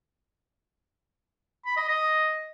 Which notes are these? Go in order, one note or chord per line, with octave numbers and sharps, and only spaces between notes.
B5
D#5
D#5